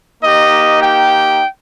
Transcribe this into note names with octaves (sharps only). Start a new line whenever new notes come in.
A#3 D#4 G4 D#5
G5